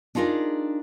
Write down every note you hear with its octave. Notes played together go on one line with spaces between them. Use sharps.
D4 D#4 F4 G#4 A#4